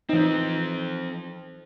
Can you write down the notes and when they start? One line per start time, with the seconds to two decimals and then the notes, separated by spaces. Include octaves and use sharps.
0.09 E3 F3 C4 D#4